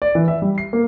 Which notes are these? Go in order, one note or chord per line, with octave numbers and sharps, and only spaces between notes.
D5
E3
E5
G3
C7
A#3